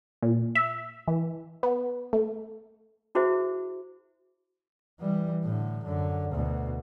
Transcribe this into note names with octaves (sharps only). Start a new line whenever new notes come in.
A#2
E5
E3
B3
A3
E4 F#4 G#4 C5 E5
E3 G3
A2 D3
F#2 D3
D2 B2